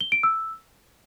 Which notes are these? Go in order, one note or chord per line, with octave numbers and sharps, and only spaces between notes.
G7
D7
E6